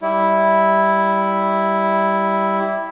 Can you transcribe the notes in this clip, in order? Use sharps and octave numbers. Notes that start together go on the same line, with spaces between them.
G3 E4